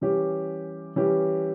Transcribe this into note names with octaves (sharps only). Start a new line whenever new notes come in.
E3 G3 C#4 G4
E3 G3 C#4 G4